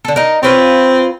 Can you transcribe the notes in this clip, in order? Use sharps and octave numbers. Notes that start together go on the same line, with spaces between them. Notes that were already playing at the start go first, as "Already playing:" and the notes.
D3 A4
D#4 A#4
C4 F4 B4 C#5